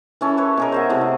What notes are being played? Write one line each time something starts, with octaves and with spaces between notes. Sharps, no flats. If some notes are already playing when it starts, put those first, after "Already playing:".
E3 C#4 A4
A4 B4 C#5
B2 G#4 A#4
C5 E5 F#5
C3 E3 A3
D#5